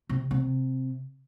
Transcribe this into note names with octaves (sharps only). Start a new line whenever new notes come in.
C3
C3